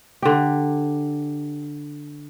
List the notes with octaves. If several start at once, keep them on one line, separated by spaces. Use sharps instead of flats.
D3 G4